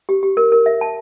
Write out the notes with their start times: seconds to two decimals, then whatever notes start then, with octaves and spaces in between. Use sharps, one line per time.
0.09 G4
0.23 G4
0.37 A#4
0.52 A#4
0.66 E5
0.81 A5